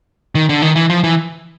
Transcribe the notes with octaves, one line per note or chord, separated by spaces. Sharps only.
D#3
D3
D#3
E3
F3
E3